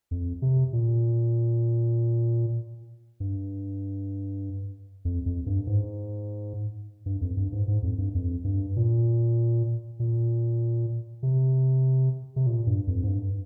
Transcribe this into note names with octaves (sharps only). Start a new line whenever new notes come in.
F2
C3
A#2
G2
F2
F2
G2
G#2
G2
F2
G2
G#2
G#2
F2
G2
F2
G2
A#2
A#2
C3
C3
A#2
G2
F2
G#2
G2